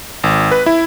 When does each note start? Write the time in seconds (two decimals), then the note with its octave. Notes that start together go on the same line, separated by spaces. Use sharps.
0.24 G#1
0.51 B4
0.66 E4